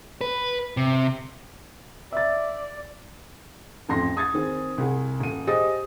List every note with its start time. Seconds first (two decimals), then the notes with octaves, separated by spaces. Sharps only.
0.21 B4
0.77 C3
2.12 D5 E5 A6
3.89 A1 F2 C6 A#6
4.17 D#6 G#6 A6
4.34 D#3 C4 G#4
4.78 C2 G#4
5.20 D#1 D#7
5.47 G4 G#4 C5 D#5 D#6 A6